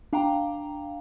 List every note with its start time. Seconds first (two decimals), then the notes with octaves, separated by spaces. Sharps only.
0.13 D4 F5 G5 A#5